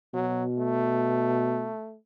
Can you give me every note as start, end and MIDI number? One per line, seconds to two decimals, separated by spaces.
0.14 1.71 47
0.14 0.44 54
0.57 1.96 57